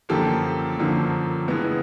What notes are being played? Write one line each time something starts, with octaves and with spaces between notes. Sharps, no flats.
F#2 D3 F3 A#3 G4 A4
F#2 D3 F3 A#3
C#3 E3 G#3 B3